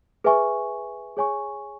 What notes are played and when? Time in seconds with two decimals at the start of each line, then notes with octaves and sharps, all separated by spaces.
0.24 G#4 B4 E5 G#5 C#6
1.17 G#4 C#5 G#5 C#6